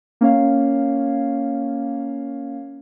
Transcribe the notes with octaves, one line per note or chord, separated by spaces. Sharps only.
A#3 C#4 C#5 F5